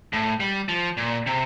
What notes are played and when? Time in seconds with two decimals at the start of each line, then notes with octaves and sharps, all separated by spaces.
0.13 A2
0.40 G3
0.69 F3
0.97 A#2
1.26 C3